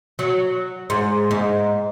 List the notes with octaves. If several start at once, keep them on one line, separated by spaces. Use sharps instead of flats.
F#3
G#2
G#2